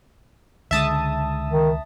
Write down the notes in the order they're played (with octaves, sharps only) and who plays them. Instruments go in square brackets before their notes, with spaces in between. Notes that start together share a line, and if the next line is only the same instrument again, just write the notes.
[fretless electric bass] C#2 D3 G#3 [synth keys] E5 A5 D#6
[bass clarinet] D#3